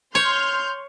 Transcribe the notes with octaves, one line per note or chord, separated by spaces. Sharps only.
C#5 C6 F6 G6